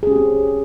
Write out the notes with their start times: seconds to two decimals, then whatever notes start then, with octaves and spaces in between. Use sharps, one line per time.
0.03 G#4
0.07 C#4
0.11 G4
0.16 C4